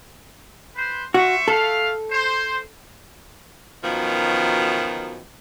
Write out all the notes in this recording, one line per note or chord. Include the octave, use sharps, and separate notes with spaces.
B4 C5
F#4 C5 E5 C#6
A3 A4 F5
C5
F#2 B2 D#3 F3